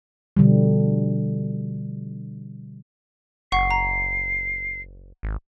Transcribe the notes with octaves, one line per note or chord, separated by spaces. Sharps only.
B2 D3 F3 G3
F#1 F#5 C#6 C7
A#5
G#1